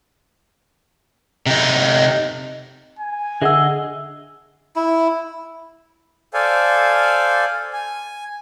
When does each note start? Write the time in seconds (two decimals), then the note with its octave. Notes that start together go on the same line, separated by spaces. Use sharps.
1.46 C3 D#4
2.99 G#5
3.42 D3 G#4 D#5 E5 F#5 E6
4.76 E4
6.34 A4 C5 D5 F5 G#5
7.73 G#5